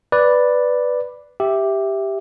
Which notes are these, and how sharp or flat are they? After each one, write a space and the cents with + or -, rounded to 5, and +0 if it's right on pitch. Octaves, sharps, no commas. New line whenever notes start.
B4 +0 D5 +0
G4 +0 E5 +0